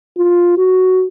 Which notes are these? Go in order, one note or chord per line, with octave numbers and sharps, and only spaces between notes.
F4
F#4